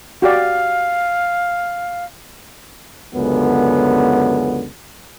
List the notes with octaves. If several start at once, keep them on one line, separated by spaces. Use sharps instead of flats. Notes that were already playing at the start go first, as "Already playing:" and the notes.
F#4 G4 D5 F5
C#2 F#2 D3 B3